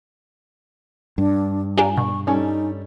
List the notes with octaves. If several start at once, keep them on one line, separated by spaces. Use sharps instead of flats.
G2 D4
D4 F4 G4 G#5 A#5
B2 C#6
G3 C#4 D#4 A4